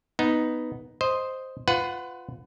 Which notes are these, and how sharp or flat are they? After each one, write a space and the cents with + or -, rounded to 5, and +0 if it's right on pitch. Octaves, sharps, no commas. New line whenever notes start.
B3 +0 D#4 +0
C5 +0 D#5 +0
F4 +0 B4 +25 F#5 +0